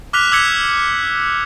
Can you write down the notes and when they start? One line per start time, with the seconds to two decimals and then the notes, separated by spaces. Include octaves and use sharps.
0.13 D6 F6 F#6 B6 F7
0.32 D6 E6 G#6 B6 C#7